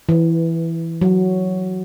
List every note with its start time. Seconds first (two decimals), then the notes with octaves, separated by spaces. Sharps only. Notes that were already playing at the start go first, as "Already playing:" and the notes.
0.09 E3
1.01 F#3